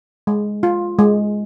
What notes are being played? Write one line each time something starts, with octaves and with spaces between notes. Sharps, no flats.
G#3
F4
G#3